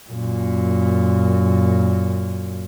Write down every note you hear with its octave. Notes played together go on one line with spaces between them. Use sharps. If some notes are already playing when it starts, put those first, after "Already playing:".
F#2 A#2